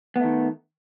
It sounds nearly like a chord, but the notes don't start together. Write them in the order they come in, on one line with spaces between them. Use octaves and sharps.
B3 A3 D#3